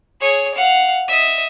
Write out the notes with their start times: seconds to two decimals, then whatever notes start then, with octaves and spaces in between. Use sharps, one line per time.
0.21 G#4 C#5
0.55 F5 F#5
1.08 D#5 E5